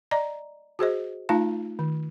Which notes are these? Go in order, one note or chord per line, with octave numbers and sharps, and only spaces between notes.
D5 D#5 A#5
F#4 G#4 C5 D#5
A3 D#4 F4 F5 A5
D#3